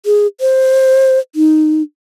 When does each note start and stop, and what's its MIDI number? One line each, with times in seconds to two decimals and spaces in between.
0.06 0.27 68
0.41 1.19 72
1.35 1.82 63